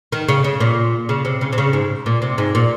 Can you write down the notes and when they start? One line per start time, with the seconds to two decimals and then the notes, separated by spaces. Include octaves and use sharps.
0.12 D#3
0.28 C#3
0.44 C#3
0.60 A#2
1.09 C#3
1.25 C3
1.41 C#3
1.53 C3
1.58 C#3
1.73 G#2
2.06 A#2
2.22 C3
2.38 G#2
2.55 A#2